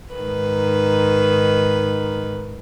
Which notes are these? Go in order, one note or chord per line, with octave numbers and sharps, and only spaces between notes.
G#2 D#3 B4